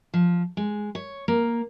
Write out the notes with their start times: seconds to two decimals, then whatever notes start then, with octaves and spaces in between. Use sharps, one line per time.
0.14 F3
0.57 G#3
0.95 C#5
1.28 A#3